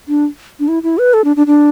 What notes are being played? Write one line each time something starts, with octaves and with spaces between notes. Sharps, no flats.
D4
D4
E4
E4
B4
A4
D4
D4
D4